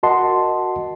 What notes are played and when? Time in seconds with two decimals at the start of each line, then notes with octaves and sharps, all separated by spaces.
0.03 F#4 A#4 D#5 F#5 A5 C6